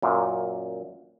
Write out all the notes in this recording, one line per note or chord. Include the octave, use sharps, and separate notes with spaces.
F#2 A#2